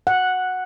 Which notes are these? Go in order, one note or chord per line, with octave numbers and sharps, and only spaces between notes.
F#5